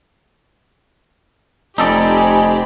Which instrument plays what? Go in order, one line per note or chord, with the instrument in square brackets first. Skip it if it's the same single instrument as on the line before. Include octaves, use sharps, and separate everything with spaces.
[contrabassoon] F1 [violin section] C4 G4 B5 [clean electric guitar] D#4 A4 D5 [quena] G#5